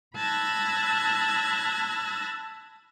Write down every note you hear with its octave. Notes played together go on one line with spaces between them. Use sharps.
A5 B5 E6 F#6 G#6 A#6